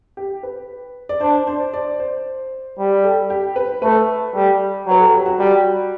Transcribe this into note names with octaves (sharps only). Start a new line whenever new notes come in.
G4
B4
D5
D4 C5
C5
D5
C5
G3
A4
G4
B4
A3 B4
G3 A4
F#3 B4
A4
G4
F#4
G3